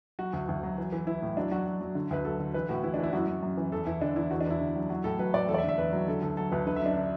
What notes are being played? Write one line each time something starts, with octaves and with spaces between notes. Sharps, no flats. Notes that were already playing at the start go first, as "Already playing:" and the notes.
F#3 F#4
D2
D2
F#3
E3
E3
E3 E4
A2
F#3 D4
F#3 F#4
F#3
F#3
D3
D2 B4
F#3 A4
D3
E3 B4
A2 F#4
E3 E4
D4
E3
E4
F#2 F#4
F#2
F#2
E3
E2 A4
E2 E4
D3 D4
E2 E4
E2 F#4
D4
E2 E4
D3
F#3
F#3 F#4
A2 A4
F#3 B4
A2 D5
E2 A4
D5
E5
D3
E5
E2 B4
F#3
D3 A4
D2 A4
F#3 A4
D2 B4
D3 B4
E5
F#2 D4
D3